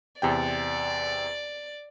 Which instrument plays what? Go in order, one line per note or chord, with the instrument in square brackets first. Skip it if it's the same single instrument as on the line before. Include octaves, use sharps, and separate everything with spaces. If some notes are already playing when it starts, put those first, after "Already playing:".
[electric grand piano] E2 C3 G5 [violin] D5